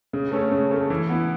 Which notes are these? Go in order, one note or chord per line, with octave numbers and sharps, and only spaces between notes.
C#3
A3 C#4 A4
C#3
A3 C#4 A4
E3
B3 E4